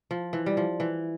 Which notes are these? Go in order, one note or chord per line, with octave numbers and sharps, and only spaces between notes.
F3
E3
G3
F3
E3